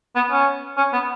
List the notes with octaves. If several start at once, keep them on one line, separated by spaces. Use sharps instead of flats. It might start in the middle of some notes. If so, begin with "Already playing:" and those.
B3
C#4
C#4
B3